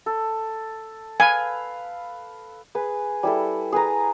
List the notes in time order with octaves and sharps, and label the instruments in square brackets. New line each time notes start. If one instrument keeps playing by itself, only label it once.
[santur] A4
[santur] B4 F5 B5 [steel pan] G#5
[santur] G#4 B4
G3 E4 A4
G#4 B4 A#5